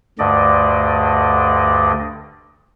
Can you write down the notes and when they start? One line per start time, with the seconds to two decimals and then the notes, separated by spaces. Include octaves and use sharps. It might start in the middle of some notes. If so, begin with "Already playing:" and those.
0.19 D2 G2 D3 D5 D#5